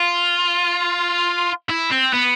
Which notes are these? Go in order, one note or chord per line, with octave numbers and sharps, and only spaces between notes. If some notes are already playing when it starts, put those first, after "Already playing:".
Already playing: F4
E4
C4
B3